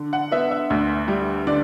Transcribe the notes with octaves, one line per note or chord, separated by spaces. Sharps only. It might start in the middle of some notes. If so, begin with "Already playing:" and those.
Already playing: D3
F#5
B3 E5
E5
D2
G3
D3 D5